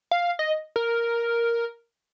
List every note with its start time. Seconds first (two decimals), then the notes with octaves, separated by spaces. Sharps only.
0.11 F5
0.39 D#5
0.76 A#4